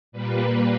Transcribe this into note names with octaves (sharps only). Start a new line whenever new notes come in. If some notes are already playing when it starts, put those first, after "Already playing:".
A#2 G3 A#3 B4